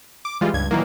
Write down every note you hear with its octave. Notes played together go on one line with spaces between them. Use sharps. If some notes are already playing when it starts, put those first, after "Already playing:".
D6
E3 G3 G#3 F4
C#2 G2 G#6
A#2 D#3 E3 F#3 A#3